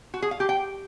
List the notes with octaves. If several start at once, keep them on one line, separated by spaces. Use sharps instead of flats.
F#4
G#4
F5
G4
G5